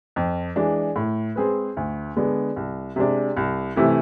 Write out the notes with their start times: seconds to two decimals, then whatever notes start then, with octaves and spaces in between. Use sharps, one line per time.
0.16 F2
0.56 E3 G#3 D4
0.96 A2
1.36 G#3 C4 G#4 B4
1.77 D2
2.16 D3 G#3 B3 D4
2.56 C2
2.96 C3 G#3 D4
3.37 C2
3.76 C3 E3 A3 E4